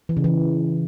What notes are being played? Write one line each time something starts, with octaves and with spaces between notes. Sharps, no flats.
E3
C#3
E3